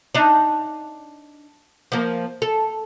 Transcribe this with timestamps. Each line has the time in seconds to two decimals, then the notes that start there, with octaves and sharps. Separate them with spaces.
0.15 D4 D#4
1.92 F3 A#3
2.42 A4